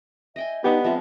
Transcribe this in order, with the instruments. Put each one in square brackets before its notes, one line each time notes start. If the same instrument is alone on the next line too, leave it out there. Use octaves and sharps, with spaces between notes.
[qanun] D#5 G5 G#5 [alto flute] E5
[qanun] G3 D4 [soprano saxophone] B3 [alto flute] D#4 [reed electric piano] G4 B4 D#5
[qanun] F3 G#3 C4 [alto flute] E5